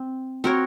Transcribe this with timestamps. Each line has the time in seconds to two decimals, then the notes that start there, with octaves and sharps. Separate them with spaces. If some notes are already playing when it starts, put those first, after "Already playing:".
Already playing: C4
0.44 C4 F#4 A#4 C#5